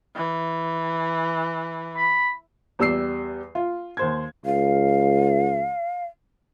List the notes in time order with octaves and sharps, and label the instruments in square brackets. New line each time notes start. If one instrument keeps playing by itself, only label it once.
[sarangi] E3
[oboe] B5
[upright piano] E2 G3 E6 C7
F4
D#2 C5 G#6
[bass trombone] C#2 [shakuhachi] F5